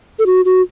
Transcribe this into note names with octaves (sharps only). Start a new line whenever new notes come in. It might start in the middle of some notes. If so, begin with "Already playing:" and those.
A4
F#4
F#4